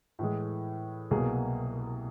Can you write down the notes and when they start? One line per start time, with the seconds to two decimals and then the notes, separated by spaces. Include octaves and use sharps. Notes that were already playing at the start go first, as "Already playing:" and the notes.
0.19 A2 E3 G#3
1.11 C2 B2 F#3 A#3 G#4